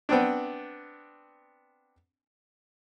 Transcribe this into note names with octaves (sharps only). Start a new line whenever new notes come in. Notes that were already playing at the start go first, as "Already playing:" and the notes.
B3 C4 D4